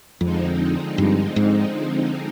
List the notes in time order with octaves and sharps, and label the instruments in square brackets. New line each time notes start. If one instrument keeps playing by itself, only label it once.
[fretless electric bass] F2 [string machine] D3 F3 G#3 C4 D#4
[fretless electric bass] G2
G#2